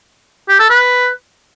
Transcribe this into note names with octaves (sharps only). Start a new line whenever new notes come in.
G4
A4
B4